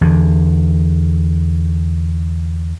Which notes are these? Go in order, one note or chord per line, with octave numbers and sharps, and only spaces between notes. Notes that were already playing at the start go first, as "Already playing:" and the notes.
E2 D3